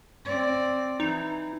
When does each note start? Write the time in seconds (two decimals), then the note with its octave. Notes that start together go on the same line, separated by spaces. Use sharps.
0.25 C4 D5
1.00 E3 D#4